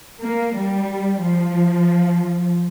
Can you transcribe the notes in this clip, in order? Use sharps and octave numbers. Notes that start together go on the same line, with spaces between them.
A#3
G3
F3